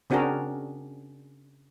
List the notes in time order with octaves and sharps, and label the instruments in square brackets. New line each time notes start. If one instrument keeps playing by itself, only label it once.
[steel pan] C#3 C4 D4 F#4 G#4 A#4